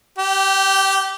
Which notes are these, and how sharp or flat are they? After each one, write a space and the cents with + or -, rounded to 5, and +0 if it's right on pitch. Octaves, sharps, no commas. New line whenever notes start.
G4 -10 G5 -35